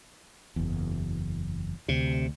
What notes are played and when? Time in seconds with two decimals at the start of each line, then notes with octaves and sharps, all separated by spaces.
0.56 F#1 E2
1.88 D2 C3